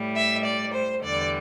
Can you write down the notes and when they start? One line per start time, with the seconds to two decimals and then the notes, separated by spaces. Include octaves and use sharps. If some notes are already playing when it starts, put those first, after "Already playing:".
Already playing: A2 G3
0.16 E5
0.45 D5
0.74 C5
1.03 E2 D3 G3 D5